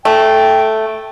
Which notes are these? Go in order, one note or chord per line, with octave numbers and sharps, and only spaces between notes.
A3 G5